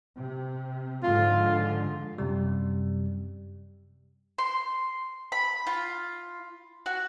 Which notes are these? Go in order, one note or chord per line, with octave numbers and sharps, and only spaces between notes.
C3
G#2 D3 F3 F4
F#2 C3 G3
C6
B5
F4
F#4